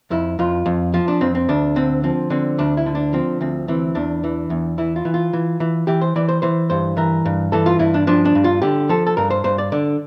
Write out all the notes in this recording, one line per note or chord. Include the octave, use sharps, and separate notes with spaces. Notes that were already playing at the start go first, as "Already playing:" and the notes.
F2 E4
F2 F4
F2
F3 F4
D4
F2 C4
C4
D2 D4
D3 C4
F3 C4
D3 C4
D2 D4
E4
D3
D4
F3 C4
D2 C4
E3 C4
E2 D4
E3
E2
E3 E4
F4
E3
F4
E3
E3
E3 G4
C5
E3 D5
C5
E3 C5
G2 C5
E3 A#4
G2
E3 A4
F4
G2 E4
D4
F3 D4
D4
G2
F4
D3 G4
F3 A4
A4
G2 A#4
C5
G2 C5
D5
D3 D5